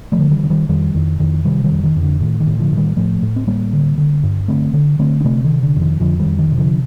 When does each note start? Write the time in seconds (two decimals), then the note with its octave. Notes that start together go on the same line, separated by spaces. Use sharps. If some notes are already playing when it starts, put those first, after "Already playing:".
0.12 F3 A3
0.18 D3
0.31 D#3 G3
0.43 D3
0.50 D#3 G3
0.69 F2 D#3 G3
0.94 F2 D#3
1.20 F2 D#3
1.44 C3 D#3 G3
1.64 D#3 G3
1.71 F2
1.84 D#3
1.96 F2
2.03 D3
2.20 A2 D#3
2.40 D#3
2.47 A2
2.59 D3 F3
2.72 A2
2.77 D#3 G3
2.97 A2 F3 A3
3.22 A2
3.36 C4
3.47 A2 G3 A#3
3.73 D3
3.98 D3
4.23 G2
4.48 D3 A3 C4
4.73 D3
4.99 D3 A3 C4
5.20 D4
5.24 C3 A3 C4
5.44 D#3
5.50 C3
5.63 D3
5.76 F2
5.81 D#3
6.00 F2 D3 F3
6.19 D#3 G3
6.26 F2
6.39 D#3
6.51 C3
6.57 D3 F3